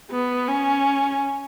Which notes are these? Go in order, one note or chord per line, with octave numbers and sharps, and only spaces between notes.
B3
C#4